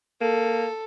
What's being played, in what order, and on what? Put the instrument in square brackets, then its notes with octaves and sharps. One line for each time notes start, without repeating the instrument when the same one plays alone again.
[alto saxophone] A#3 [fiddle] A4